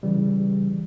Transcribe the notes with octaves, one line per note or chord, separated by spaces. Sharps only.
C#3 E3 G3